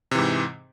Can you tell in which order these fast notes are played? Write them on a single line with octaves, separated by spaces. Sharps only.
C3 E3 G#2